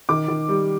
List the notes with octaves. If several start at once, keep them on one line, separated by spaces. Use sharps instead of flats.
D#3 D6
D#3
G3